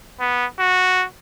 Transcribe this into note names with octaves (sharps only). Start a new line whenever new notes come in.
B3
F#4